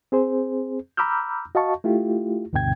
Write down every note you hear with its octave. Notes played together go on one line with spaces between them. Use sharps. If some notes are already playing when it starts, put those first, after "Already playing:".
C4 G#4 C5
A#5 B5 D6 E6 F6 G6
F#4 D#5 F5 A5 C#6
A3 E4 F4 G4
D2 G2 B2 D3 G5 G#6